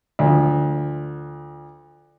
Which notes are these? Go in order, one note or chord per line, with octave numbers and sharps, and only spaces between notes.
D2 F3